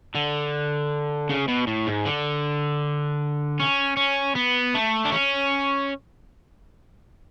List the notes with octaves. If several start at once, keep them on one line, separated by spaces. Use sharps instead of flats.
D3
C#3
B2
A2
G#2
D3
C#4
C#4
B3
A3
D4
C#4